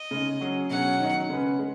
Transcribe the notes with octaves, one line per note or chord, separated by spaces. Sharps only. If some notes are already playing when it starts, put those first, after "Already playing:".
Already playing: D#5
C#3 G#3 D#4
F#3 C#4 G#4
B2 F#3 C#4 F#5
D#3 F#3 D#4
C#3 G#3 C#4 B4
G#3